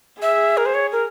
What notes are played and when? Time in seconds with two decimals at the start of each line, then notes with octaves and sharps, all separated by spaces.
0.22 G#4 E5
0.57 A#4
0.66 C5
0.74 C#5
0.92 A#4